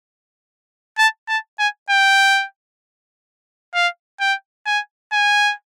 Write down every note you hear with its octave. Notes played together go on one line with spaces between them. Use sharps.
A5
A5
G#5
G5
F5
G5
G#5
G#5